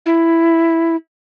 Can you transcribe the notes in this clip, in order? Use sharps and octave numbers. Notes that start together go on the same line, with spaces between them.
E4